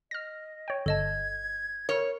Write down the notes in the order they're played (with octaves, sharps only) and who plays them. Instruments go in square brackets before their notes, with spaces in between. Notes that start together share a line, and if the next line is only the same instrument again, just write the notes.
[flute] D#5 [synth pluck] F6 A#6
[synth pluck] C#5 G5
[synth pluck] G1 [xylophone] A4 D#5 A5 [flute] G#6
[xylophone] A#4 F6 [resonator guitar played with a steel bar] C#5